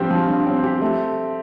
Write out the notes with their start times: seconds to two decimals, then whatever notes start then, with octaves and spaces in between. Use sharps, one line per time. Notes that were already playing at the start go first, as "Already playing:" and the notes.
Already playing: G2 F3 C4 G4
0.11 F3
0.28 G2
0.46 C4
0.64 G4
0.81 A3